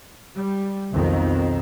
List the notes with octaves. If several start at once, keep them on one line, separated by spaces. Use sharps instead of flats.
G3
B1 F2 D#3